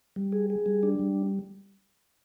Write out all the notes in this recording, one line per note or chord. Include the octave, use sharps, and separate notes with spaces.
G3
G#4
G#4
G3
D4
G3